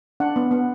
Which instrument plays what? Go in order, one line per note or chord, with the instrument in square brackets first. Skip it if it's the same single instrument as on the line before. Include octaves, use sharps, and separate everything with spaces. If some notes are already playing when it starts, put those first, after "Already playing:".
[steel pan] D4 F#5
B3
B3